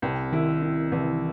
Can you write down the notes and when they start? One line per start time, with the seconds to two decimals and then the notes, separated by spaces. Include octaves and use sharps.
0.02 C2 C4
0.32 D#3 E4
0.62 E4
0.92 C2 E3